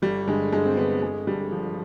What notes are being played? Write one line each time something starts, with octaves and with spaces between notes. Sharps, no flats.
G1 G3
G2 D3 G#3
G1 G#3
C4
G2 D3 B3
G1 G#3
G2 D3 G3
G1 F3